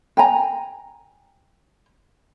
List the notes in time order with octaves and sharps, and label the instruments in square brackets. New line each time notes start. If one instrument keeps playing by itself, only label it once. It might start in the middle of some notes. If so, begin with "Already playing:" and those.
[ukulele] G5 G#5 A#5